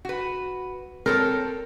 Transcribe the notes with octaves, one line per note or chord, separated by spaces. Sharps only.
F#4 B4
C4 A4 A#4 C#5